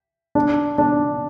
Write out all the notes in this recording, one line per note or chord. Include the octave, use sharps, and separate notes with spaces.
D4
D4